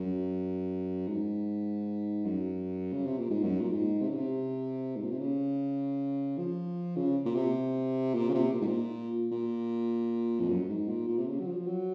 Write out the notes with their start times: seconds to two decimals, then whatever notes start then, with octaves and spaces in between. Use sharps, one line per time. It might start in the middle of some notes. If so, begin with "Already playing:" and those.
Already playing: F#2
1.08 G#2
2.25 F#2
2.93 C#3
3.06 C3
3.18 A#2
3.30 G#2
3.43 F#2
3.61 A#2
3.72 G#2
4.02 C3
4.09 C#3
4.16 C3
4.97 G#2
5.04 A#2
5.12 C3
5.19 C#3
6.37 F3
6.96 C#3
7.25 A#2
7.35 C3
8.14 A#2
8.29 C#3
8.34 C3
8.53 A#2
8.61 G#2
8.67 A#2
9.32 A#2
10.40 F2
10.49 F#2
10.69 G#2
10.88 A#2
11.08 A#2
11.18 C3
11.28 C#3
11.40 F#3
11.47 F3
11.67 F#3